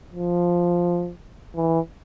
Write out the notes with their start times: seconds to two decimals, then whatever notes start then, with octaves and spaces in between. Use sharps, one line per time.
0.13 F3
1.55 E3